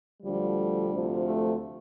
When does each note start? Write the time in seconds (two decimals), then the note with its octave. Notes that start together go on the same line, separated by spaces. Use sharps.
0.22 D2 D3 F3 G3
0.90 D2 C3 F3
1.23 A3